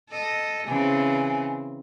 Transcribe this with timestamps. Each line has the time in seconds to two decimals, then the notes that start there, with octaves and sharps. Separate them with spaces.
0.10 A4 D#5
0.67 C#3 E3 C4 G#5